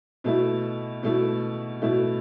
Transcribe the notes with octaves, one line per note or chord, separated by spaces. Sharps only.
B2 A3 E4
B2 A3 E4
B2 A3 E4